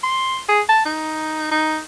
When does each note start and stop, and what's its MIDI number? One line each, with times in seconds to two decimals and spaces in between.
0.03 0.39 84
0.49 0.61 68
0.69 0.81 81
0.86 1.50 63
1.51 1.78 63